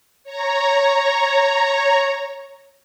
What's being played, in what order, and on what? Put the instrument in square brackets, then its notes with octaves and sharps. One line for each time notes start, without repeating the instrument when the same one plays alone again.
[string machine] C#5 A#5